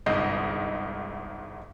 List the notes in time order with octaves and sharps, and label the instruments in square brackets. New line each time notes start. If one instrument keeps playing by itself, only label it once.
[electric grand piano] G1 C2 G#2 D#5 G6 C7